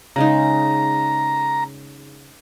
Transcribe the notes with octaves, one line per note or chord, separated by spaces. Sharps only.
C#3 G#3 D#4 A#5